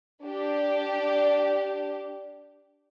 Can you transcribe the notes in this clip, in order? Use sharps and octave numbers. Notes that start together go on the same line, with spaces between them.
D4 G4